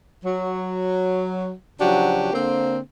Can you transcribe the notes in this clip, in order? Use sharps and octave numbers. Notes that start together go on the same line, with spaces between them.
F#3
C#3 F3 F#3 D4 F#4 G4
D3 A#3 C4